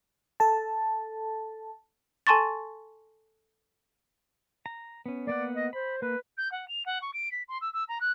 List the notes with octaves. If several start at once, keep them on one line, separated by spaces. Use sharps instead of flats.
A4 A5
A4 G#5 A5 C6 C#6 A6
A#5
B3 C#4
A#3 B3 D5 F#5
D#5
C5 B5
A#3 B4
G6
F#5
F7
F#5
C#6
D7
B6
C6
E6
E6
A#5
F#6